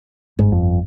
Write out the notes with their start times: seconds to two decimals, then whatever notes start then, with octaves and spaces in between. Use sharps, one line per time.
0.39 G1 G#2
0.52 F2